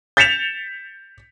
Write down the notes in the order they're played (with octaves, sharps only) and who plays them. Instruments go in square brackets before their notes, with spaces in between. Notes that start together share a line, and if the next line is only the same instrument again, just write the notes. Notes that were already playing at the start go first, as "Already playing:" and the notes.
[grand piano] G6 A6 B6 C#7 E7 F7